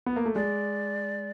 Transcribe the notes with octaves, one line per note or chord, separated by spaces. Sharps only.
B3
A#3
A3
G#3 D5